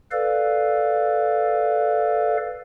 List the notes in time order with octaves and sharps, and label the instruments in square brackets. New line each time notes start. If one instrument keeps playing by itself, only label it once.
[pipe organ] A4 B4 D5 F5